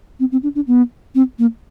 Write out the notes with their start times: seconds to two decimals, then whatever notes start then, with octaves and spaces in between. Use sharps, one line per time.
0.20 C4
0.32 C4
0.43 D4
0.55 D4
0.67 B3
1.15 C4
1.39 A#3